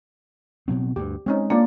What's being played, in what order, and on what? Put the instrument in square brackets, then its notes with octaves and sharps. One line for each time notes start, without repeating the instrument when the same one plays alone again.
[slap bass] B2 F#3 C4
[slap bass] D2 G2 [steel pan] G4
[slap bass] G#3 [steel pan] C4 C#4 D#4
[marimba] A#3 [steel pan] D4 F4 D5